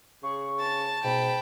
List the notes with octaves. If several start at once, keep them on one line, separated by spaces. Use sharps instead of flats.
C#3 G#4 C#6
A5 A6
G#2 B2 G5 B5